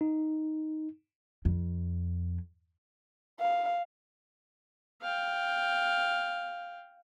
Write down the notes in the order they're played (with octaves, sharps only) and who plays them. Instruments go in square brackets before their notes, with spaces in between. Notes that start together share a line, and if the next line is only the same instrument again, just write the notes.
[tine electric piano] D#4
[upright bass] F2
[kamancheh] F5
[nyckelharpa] F5 G5